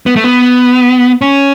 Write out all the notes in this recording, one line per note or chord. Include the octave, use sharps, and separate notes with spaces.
B3
A3
B3
C#4